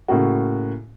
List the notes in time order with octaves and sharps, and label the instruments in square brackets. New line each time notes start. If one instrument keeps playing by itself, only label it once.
[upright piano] A2 C#3 A#3 F#4